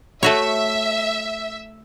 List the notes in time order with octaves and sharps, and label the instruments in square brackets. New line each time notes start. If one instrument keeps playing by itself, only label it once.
[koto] A3 F#4 C#5 [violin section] E5